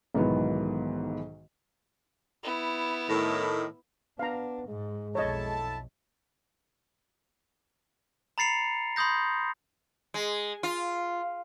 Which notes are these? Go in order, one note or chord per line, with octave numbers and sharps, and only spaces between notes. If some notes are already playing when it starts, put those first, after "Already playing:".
B1 G#2 D#3 E3 F#3 B3
B3 E4
A2 D#3
B3 D4 F5 A#5
G#2 G#3
B1 F2 E4 A4 C#5 D#5 A5
A#5 B5 A6 C7 C#7 F7
B5 C6 D#6 G6 A#6
G#3
F4